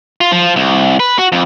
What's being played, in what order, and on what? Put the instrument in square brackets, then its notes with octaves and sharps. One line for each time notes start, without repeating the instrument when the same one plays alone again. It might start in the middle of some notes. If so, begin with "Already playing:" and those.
[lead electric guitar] F4
F3
C2
B4
F#4
F2